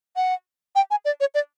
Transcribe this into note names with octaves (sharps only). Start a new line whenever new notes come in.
F#5
G5
G#5
D5
C#5
D5